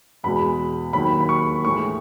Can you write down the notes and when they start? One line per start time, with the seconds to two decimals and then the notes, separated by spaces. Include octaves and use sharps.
0.23 E2 B2 G#3 B5
0.93 D#2 D#3 F#3 B5
1.21 B5
1.29 C#6
1.64 A2 E3 G#3 C#6